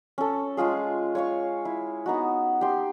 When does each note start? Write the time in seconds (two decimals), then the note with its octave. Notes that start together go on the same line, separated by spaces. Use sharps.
0.18 C#4 A4
0.57 G#3 C#4 F4 G#4
1.15 C#5 F5 C#6
1.65 E4
2.06 B3 D#4 F#4
2.61 G4 C6